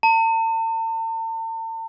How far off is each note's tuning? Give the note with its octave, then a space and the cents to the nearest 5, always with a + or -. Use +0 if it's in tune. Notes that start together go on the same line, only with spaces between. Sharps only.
A5 +45